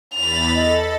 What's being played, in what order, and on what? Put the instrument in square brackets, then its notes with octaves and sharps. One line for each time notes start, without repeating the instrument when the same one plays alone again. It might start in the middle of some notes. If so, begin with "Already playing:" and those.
[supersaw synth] E2 B5 A6 [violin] F7
[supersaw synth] A4 [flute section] D#5